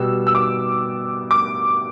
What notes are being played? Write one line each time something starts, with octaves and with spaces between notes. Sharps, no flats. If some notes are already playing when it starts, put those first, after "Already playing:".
Already playing: B2 G3 E6
E6
D6
D6